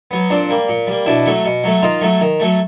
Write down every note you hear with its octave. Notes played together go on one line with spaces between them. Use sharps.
F#3 B3
A#2 C4 D4
G3 A#3
A#2
G3 A#3
B2 D4 E4
F#3 A3
B2
F#3 A3
D#3 D#4 F4
F#3 A3
D#3
F#3 A3